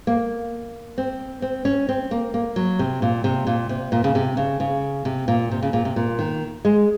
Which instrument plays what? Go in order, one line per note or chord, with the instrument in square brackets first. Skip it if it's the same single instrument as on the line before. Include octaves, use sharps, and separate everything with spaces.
[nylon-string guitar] A#3
C4
C4
C#4
C4
A#3
A#3
F#3
C3
A#2
C3
A#2
C3
A#2
C#3
C3
C#3
C#3
C3
A#2
C3
C#3
A#2
C3
A#2
D#3
G#3